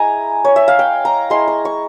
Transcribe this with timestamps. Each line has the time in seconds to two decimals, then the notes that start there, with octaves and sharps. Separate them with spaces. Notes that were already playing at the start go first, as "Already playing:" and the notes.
Already playing: G#3 E4 G#5 A#5
0.45 C#5
0.56 E5
0.68 F5
0.79 G5
1.05 A#5
1.30 G#3 E4 C6
1.48 C#6
1.65 C#6